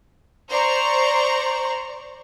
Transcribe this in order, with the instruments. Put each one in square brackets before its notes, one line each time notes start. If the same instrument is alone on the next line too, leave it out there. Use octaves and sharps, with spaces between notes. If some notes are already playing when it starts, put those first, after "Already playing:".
[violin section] C5 D5 A#5 C#6